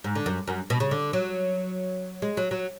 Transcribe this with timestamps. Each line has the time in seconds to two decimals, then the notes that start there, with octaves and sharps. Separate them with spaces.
0.04 G#2
0.15 D3
0.26 F#2
0.47 F#2
0.70 B2
0.80 C#3
0.91 D3
1.13 F#3
2.22 G#3
2.37 F#3
2.51 F#3